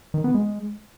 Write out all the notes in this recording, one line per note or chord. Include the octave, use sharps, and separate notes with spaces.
D#3
B3
G#3